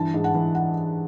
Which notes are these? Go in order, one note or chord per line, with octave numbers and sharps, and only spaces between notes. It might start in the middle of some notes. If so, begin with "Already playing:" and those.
Already playing: G2 E3 A5
G#2
F#5
E3
F#5